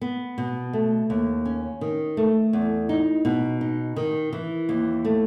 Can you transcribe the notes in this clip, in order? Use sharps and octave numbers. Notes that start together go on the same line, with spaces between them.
B3
B2
A3
D#2
C#4
D#3
A3
E2
D#4
B2
D#4
D#3
E3
D#2
A3